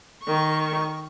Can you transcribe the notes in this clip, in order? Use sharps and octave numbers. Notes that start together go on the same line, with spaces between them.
D#3 C#6